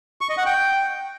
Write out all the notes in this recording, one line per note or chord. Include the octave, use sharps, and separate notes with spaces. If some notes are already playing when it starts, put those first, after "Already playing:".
C#6
D#5
F#5
G5